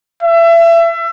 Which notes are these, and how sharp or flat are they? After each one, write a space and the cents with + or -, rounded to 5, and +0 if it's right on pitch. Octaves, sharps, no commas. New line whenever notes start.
E5 +30